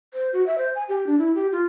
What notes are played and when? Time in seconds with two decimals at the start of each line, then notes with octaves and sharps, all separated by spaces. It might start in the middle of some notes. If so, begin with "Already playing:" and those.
0.14 C5
0.33 F#4
0.46 E5
0.58 C5
0.75 G#5
0.89 G4
1.07 D4
1.19 E4
1.35 G4
1.52 F4